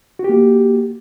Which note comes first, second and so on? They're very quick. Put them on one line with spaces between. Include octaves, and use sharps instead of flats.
F#4 G4 A#3